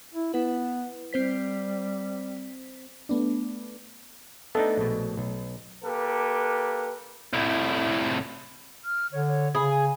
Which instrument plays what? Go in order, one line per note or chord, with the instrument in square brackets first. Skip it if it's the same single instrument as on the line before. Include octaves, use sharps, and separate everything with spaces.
[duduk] E4
[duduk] B3 [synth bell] E4 B4
[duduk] G3 [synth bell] C4 C5 B6
[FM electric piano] A3 B3 D4
[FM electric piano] A3 A4 D#5 [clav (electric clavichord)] B3 D4 D#4
[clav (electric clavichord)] A#1 B2
B1
[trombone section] A#3 G4 A4 B4
[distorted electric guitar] C2 A2
[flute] F6
[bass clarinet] D3 [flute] C#5
[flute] C#5
[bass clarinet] C#3 [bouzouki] G#4 [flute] B5
[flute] G#5